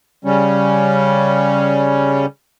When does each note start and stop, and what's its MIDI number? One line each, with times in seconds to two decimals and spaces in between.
0.25 2.26 49
0.25 2.26 55
0.25 2.26 61